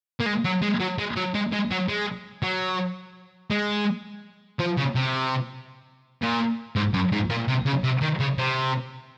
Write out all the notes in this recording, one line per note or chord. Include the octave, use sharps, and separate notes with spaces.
A#3
G#3
F#3
G#3
F#3
G#3
F#3
G#3
G#3
F#3
G#3
F#3
G#3
F3
C#3
C3
A#2
G#2
F#2
G#2
A#2
C3
C#3
C3
D#3
C#3
C3